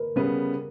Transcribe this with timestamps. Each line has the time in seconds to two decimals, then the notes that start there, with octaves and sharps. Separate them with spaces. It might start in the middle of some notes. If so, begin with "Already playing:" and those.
Already playing: A#4 B4
0.16 C#3 G3 B3